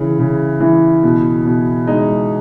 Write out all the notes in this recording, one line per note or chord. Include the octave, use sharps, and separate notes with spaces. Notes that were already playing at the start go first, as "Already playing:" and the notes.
Already playing: C#3 E3
C#3
E3
B2
B2
G#3 D#4